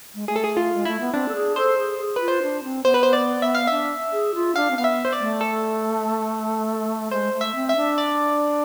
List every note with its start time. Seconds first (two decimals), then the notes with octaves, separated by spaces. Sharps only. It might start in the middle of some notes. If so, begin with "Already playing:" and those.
0.15 G#3
0.28 A3 G#4
0.36 A4
0.44 G#4
0.57 F4
0.74 G#3
0.85 A3 E4
1.00 B3
1.14 C4 D4
1.29 A4
1.35 G#4
1.56 A4 C5
1.78 G#4
1.99 G#4
2.16 F4 B4
2.28 C5
2.42 D4
2.64 C4
2.84 B3 C5
2.94 B4
3.03 C5
3.13 D5
3.42 E5
3.55 F5
3.67 D4 E5
4.13 G#4
4.35 F4
4.56 D4 F5
4.71 C4
4.78 B3 F5
4.84 E5
5.05 C5
5.13 D5
5.20 A3
5.41 A4
7.11 G#3 C5
7.33 A3
7.41 E5
7.55 C4
7.69 E5
7.76 D4
7.98 D5